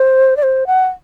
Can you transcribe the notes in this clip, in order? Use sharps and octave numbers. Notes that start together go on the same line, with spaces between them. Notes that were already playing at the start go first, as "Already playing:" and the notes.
Already playing: C5
D5
C5
F#5